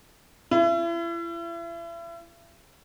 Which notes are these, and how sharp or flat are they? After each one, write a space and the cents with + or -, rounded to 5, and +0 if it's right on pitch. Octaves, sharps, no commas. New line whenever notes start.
E4 +40